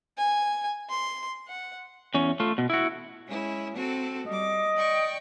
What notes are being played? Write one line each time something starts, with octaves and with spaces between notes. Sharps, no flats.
G#5
C6
F#5
E2 C#4
A3 F4
B2
E4 F#4
G#3 C#4 E4
C4 F#4 A4
G3 D#5 D6
D5 G5 C#6